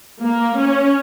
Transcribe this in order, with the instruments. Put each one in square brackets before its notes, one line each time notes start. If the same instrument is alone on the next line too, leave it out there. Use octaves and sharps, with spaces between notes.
[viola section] A#3
C#4